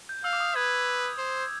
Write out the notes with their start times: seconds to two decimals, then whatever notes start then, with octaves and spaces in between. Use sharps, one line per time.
0.09 G6
0.24 F5 E6
0.33 D6
0.40 D#6
0.56 B4 G#6
1.18 C5